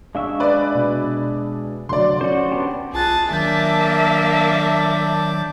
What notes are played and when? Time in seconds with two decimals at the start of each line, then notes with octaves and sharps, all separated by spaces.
0.15 G#3 D4 E5 F5 C#6
0.40 B4 D5
0.75 B2
1.89 D2 D3 F#3 D5 C6
2.21 C#4 F#4 C5
2.51 B3 D4 G4
2.93 C2 F4 G#4 A5 F#6
3.31 D#3 F#3 A#3 D4 E5 A5 G6